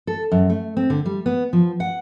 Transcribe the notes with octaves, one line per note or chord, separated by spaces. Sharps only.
A4
F#2
A3
C4
D3
G3
B3
F3
F#5